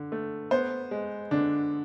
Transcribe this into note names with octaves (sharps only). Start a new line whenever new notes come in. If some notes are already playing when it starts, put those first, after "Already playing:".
Already playing: D3
A3
B3 C5
G#3
D3 D4